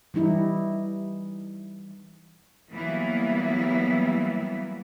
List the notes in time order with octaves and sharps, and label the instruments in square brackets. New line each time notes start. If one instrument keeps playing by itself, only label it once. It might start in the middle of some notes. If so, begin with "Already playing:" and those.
[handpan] E3 G3 D#4 E4
[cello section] E3 F#3 G3 A#3 B3 E4